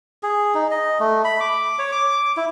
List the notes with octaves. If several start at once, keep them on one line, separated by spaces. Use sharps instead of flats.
G#4
D#4
D#5
A3
B5
D6
C#5
D6
E4